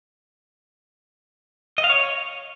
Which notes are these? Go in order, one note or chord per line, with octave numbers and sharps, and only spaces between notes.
D#5
F5
C#5